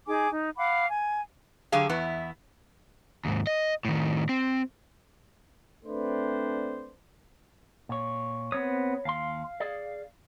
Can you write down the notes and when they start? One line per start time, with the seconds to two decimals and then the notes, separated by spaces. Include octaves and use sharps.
0.07 D#4 G#4 G#5 D6
0.31 D#4
0.57 F5 F#5 B5 D6
0.88 G#5
1.72 D3 F#3 G4 G#4 F5
1.89 E2 B3 E4
3.25 D#2 G#2
3.47 D#5
3.85 A2 D#3
4.29 C4
5.85 A3 C4 D4 B4 C5 D5
7.89 A#2 C#5
8.52 B3 C4 C#5 D#6
9.05 D#2 F5 C6
9.60 G#4 D5